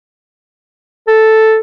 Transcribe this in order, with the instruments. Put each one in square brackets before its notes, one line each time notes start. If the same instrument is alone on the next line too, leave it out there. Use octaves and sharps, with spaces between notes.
[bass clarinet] A4